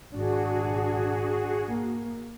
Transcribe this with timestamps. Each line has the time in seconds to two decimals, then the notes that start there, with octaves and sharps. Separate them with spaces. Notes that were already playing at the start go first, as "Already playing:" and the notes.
0.13 G#1 D4 F#4 G#4
1.69 A#3